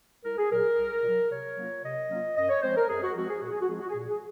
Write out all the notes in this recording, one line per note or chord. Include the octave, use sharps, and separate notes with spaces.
C2 A#4
G#4
A#2 F#3 A#4
C2
A#2
F#3
C3 C#5
F#3 A#3 C#4 F4
C3 D#5
F#3 A#3 C#4 F4
F#2 D#5
C#5
F3 G#3 C4 C5
A#4
F#2 G#4
F#4
F3 G#3 C4 F#4
G#4
A#2 F#4
G#4
F#4
F3 G#3 C4 F4 G#4
F#4
G#4
A#2 F#4
G#4